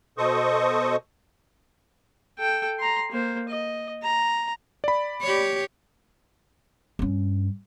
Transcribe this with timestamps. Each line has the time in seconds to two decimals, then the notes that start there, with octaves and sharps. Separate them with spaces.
0.18 B2 A4 C5 D#5 C#6 D#6
2.39 A4 G5
2.79 A#5 C6
3.11 A#3 C5
3.49 D#5
4.02 A#5
4.84 D5 B5
5.22 G4 C#5
6.99 G2 C#4